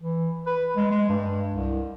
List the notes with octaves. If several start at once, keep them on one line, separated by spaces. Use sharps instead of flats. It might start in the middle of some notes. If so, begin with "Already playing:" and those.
E3
B4
G#3
G#3
G2
C2